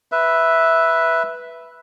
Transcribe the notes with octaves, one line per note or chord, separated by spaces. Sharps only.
B4 E5